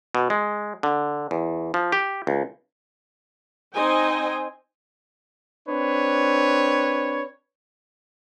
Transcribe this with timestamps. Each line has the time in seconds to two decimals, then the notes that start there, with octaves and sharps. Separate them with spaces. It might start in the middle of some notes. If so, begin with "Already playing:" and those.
0.15 B2
0.30 G#3
0.83 D3
1.31 E2
1.74 F3
1.92 G4
2.27 C#2
3.73 C4 D#4 C5 D#5 G5 G#5
5.67 C4 D4 B4 C#5